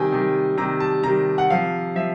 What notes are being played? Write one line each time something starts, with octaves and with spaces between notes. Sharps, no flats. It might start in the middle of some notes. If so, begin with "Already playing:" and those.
Already playing: C3 D#3 G3 G5 G#5
C3 D#3 G3
C3 D#3 G3 A#5
A5
C3 D#3 G3 A#5
F#5
C3 F3 F5
F3 E5